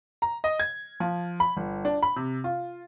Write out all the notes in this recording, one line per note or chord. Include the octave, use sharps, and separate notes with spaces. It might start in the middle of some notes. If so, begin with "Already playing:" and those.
A#5
D#5
G#6
F3
B5
G1
D4
B5
C3
F4